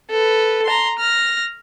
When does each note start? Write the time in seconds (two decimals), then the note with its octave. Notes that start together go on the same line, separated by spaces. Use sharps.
0.10 A4 B4
0.66 A#5 C6
0.99 F6 A#6